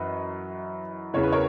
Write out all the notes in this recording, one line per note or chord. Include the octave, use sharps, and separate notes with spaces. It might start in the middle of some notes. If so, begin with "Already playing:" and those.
Already playing: F#2 E3 B4 D#5
E2 C#3 E3 C#5
B4
A#4 C#5